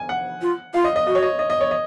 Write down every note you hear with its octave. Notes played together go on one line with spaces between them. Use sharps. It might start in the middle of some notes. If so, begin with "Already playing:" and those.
Already playing: G#5
F#5
F4
F4 F5
D#5
D#5
F#4 D#5
C#5
D#5
D#5
D#5
C#5
D#5